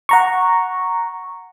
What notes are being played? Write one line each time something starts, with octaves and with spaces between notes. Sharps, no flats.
F#5 A#5 C#6